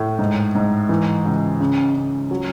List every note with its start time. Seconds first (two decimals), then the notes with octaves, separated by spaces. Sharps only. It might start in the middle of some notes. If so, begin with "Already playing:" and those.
Already playing: A2
0.19 G#2
0.55 G#2
0.89 E3
1.25 C#2
1.60 C#3
1.95 C#3
2.31 F#3